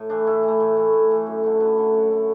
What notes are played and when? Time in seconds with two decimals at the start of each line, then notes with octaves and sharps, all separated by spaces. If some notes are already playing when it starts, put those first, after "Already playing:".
Already playing: A2
0.10 E3 A3 D4
0.27 A2 E4
0.43 E3
0.48 A3
0.60 A2
0.77 E3 A3
0.93 A2
1.11 E3 A3
1.27 F#2
1.44 D3 A3
1.60 F#2 B4
1.77 D3 A3
1.94 F#2 C#5
2.11 D3 A3